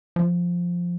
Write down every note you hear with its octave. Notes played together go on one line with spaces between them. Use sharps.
F3